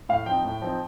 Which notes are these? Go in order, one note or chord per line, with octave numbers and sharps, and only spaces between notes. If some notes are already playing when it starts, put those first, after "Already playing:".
A2 F5
F3 C4 D#4 G5
A2
F3 C4 D#4